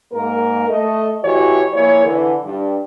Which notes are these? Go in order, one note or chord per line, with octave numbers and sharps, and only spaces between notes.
G#2 A#3 A#4
A3 A4 D#5
A2 E3 F#4 G4 C#5 D#5
F3 A#3 E4 G#4 C#5
D3 E3
G2